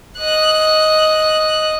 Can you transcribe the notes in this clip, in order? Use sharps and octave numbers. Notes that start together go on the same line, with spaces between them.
D#5 F#6